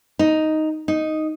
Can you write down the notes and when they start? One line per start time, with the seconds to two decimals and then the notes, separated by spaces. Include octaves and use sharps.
0.19 D#4
0.88 D#4